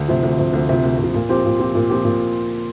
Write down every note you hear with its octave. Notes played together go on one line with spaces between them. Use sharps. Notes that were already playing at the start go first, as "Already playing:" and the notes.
Already playing: D2
C3 F3
D2
C3 F3
D2
C3 F3
D2
C3
F3
A#2
F3 C4 G4
A#2
F3 C4 G4
A#2
F3 C4 G4
A#2